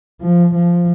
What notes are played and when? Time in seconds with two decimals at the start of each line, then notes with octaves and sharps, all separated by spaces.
0.22 F3
0.54 F3